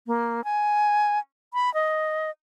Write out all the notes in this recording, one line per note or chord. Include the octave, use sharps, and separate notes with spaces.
A#3
G#5
B5
D#5